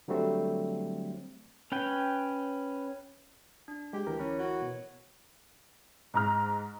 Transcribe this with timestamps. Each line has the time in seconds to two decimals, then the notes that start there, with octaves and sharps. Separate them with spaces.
0.08 D3 F#3 G3 A3 C4
1.72 C#4 B4 G5
3.68 D4
3.93 G#3 G4
4.07 D2 E3 A#4
4.19 C#4 E4
4.39 F#4 C#5
4.62 B2
6.14 G#2 A#5 F6